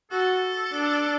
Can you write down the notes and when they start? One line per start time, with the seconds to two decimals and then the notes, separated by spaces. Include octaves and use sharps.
0.11 F#4 A4
0.73 D4